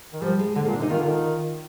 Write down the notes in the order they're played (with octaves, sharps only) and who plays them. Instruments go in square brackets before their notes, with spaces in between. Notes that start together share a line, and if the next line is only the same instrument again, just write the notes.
[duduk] D#3
[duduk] F3 [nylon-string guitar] G3
[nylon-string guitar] G#3
[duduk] D3 [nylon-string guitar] G#3
[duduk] A#2 [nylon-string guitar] A#3
[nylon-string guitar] D4
[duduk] C3 [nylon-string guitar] D#4
[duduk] D#3 [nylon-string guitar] F4
[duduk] D3
D#3